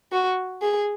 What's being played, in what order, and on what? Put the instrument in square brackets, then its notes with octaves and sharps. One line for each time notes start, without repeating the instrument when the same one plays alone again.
[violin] F#4
G#4